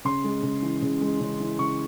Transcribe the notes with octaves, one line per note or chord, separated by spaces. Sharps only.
C#3 C6
G#3
C#3
E3
C#3
G#3
C#3
E3
C#3 C#6